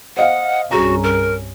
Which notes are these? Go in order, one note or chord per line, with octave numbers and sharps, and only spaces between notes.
C5 D#5 F5 F#5
C2 G2 C#4 F#4 G#4 A#5
A#4